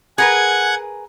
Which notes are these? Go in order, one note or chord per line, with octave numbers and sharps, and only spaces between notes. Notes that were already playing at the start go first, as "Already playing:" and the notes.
G#4 A#4 B4 F#5 G#5 G#6